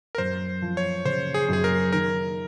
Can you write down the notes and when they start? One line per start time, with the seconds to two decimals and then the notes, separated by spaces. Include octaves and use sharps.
0.15 A#4
0.18 F#2 C5
0.62 F3
0.77 C#5
1.05 C#3 C5
1.34 G#4
1.49 F#2 G#4
1.64 A#4
1.92 D#3 A#4